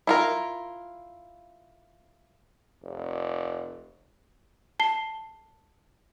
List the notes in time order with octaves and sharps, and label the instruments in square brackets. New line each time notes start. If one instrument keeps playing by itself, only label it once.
[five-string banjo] E4 F4 A#4
[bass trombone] F1
[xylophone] A5 C7 G7